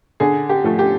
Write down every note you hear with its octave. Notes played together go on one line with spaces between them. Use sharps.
D3 G#4
G4
F3 A3
G4